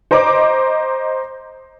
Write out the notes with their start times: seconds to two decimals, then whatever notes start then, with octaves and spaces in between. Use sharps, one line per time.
0.11 C5 D#5 A#5 D6